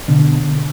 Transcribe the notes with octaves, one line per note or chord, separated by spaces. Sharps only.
B2 D3